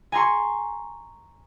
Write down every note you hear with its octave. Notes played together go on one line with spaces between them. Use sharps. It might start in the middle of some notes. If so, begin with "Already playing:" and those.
G#5 A#5 C6 C#6